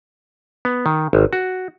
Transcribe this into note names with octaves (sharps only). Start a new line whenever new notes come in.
B3
D#3
G#1
F#4